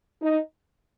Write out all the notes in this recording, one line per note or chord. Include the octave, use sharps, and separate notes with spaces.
D#4